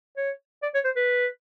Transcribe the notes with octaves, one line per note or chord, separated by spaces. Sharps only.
C#5
D5
C#5
C5
B4